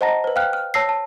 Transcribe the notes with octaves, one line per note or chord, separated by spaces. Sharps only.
C5 D#5 F#5 A5 A#5 A#6
B4 C5
F5 G5 F6 F#6
F6
C#5 A5 E6 A#6 C7
A5